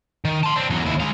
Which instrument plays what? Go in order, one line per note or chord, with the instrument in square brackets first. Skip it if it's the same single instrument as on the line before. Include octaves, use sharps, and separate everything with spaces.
[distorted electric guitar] D#3
A5 C6
C4 D4
E2 F#3
D#2 E4
G#3 F5